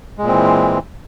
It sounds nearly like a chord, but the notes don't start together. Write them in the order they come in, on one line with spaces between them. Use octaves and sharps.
G#3 A#2 C4 E3